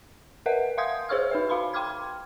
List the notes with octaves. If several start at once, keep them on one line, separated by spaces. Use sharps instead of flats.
A#4 B4 D#5 E5 F#5
E5 F5 C6 D#6 G6 G#6
G#4 C5 C#5 C#6 E6 F6
D#4 B4 E5
F#4 F5 B5 C6
G5 C6 D6 F6 G#6